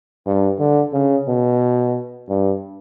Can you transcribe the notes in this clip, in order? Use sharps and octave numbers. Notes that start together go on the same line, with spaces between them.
G2
D3
C#3
B2
G2